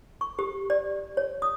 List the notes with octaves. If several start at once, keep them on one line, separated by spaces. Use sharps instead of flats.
C#6
G4
D5
C#5
D#6